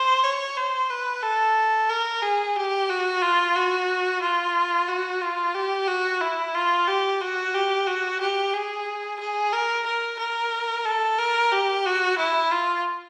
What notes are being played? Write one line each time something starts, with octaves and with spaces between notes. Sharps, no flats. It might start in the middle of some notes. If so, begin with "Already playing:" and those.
Already playing: C5
C#5
C5
B4
A4
A#4
G#4
G4
F#4
F4
F#4
F4
F#4
F4
G4
F#4
E4
F4
G4
F#4
G4
F#4
G4
G#4
G#4
A#4
A#4
A#4
A4
A#4
G4
F#4
E4
F4